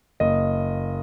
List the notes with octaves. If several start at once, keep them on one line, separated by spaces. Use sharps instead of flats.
F#1 D#5